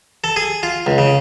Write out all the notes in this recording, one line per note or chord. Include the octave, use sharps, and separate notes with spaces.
A4
G#4
F4
C#2
C#3